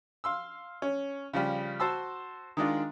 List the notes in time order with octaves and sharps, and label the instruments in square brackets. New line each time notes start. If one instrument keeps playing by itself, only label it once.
[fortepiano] F5 C6 E6
C#4
C#3 F3 G3
F#4 C5 A5 C6 E6
D#3 G#3 D4 F4